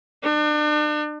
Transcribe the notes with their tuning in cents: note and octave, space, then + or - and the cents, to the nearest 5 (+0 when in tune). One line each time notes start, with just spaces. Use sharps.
D4 +40